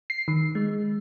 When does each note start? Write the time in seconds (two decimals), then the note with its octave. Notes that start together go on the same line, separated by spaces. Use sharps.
0.10 C7
0.28 D#3
0.55 G#3